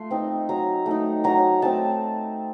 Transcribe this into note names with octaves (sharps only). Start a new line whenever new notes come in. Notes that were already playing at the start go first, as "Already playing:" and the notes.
Already playing: A3 F4 C6
C4 D#4
F#3 A#5
A3 D#4
F#3 A#5
A3 C4 A5